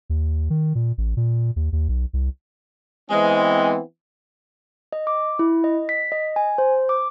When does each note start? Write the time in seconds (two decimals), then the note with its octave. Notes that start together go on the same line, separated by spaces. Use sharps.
0.10 D#2
0.50 D#3
0.75 A#2
0.98 A1
1.17 A#2
1.56 D#2
1.73 D#2
1.89 B1
2.13 C2
3.09 E3 G#3 B3 C4
4.93 D#5
5.07 D6
5.39 E4
5.64 D#5
5.89 B6
6.12 D#5
6.36 G#5
6.58 C5
6.89 D6